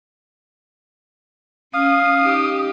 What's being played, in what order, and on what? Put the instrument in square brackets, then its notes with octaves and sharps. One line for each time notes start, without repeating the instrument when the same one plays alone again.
[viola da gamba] C#4 [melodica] F5 [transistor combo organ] D#6
[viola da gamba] D#4 G4